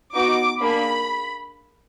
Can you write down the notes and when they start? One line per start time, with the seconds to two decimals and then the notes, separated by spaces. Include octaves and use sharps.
0.14 B3 D#4 F#4 D6
0.61 A#3 D4 G#4 B5